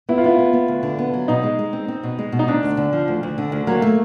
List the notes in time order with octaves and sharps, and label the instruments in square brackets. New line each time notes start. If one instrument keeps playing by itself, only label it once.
[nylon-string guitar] B3 [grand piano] E4
[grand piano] F4
[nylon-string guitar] B3 [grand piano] E4
[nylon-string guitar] B3
B3
D2
D3
B3
F#3
[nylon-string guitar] B2 [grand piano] D#4
[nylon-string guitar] G#3
G#3
C4
C4
B2
G#3
B2
[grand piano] D#4
[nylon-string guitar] D2 [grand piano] D4
[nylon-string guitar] D2
D3
F3
D2
D2
D3
D2
[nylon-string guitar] F#3 [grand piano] A#3
[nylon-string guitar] A3